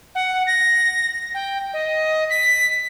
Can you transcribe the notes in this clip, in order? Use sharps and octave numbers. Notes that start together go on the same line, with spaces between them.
F#5
A#6
G5
D#5
B6